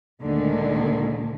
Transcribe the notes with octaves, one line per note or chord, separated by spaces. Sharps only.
D2 A#2 D3 D#3 G#3